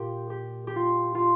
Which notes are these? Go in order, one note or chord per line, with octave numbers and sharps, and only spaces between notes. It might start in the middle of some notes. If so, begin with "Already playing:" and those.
Already playing: A#2 F4 G4
G4
G4
F4
F4